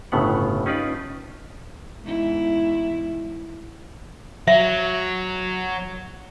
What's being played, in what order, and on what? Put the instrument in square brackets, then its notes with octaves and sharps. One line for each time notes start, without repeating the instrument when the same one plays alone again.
[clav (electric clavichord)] G1 A2 C#3 B3 F#5
C#4 D#4 F4 B4 D5
[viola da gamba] E2 G#2 E4
[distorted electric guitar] F#3 [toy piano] E5